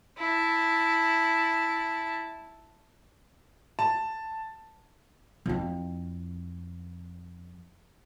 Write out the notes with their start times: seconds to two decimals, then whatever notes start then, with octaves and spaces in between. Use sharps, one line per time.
0.18 E4 A5
3.79 A5
5.46 F2 E4